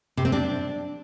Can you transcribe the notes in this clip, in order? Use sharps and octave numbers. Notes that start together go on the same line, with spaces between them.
C3
C4
D4